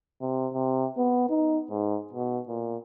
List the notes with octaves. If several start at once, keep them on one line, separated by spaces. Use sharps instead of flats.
C3
C3
B3
D#4
G#2
B2
A#2